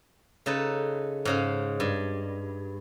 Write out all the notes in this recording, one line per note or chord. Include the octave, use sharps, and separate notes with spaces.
C#3 D#4 A4 B4
G#2 C#3 F5
G2